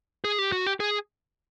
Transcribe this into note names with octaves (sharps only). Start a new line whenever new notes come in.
G#4
G4
F#4
G4
G#4